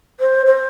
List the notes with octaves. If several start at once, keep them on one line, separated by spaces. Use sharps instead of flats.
C5
C5